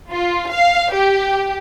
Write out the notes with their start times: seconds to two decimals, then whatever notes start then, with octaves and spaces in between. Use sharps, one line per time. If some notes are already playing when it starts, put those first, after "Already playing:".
0.10 F4
0.49 F5
0.91 G4